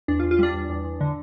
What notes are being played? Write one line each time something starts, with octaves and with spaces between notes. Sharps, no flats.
E2 D4
F4
E2
F4
G3 D4
E2
E2
E2
D3